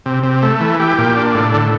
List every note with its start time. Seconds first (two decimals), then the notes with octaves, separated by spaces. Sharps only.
0.06 C3
0.23 C3
0.42 A3
0.61 E3
0.80 G4
0.98 A#2
1.17 D4
1.35 A2
1.54 D3